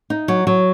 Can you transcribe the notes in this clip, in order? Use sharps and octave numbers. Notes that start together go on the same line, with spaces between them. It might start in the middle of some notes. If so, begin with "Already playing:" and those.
D#4
F#3
F#3